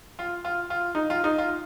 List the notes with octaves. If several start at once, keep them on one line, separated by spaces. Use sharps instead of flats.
F4
F4
F4
D#4
F4
D#4
F4